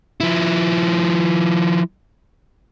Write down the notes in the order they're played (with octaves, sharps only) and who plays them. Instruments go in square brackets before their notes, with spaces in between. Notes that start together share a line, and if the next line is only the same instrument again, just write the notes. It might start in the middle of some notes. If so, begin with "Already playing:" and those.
[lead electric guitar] F3 E4